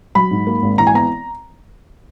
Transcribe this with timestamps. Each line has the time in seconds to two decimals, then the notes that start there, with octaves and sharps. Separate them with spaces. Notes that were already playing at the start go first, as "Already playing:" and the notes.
0.15 F#3 B5
0.31 G#2
0.47 A#3
0.62 G#1
0.78 E3 A#5
0.87 G#5
0.94 B3 A#5